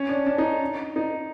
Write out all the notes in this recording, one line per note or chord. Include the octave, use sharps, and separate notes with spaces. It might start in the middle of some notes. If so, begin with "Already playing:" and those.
Already playing: C#4
D4
D4
D#4
D#4